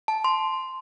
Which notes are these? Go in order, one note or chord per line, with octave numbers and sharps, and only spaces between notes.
A5
C6